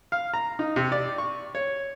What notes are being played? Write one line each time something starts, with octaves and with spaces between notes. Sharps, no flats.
F5
A#5
D#4
C3
D5
C#6
C#5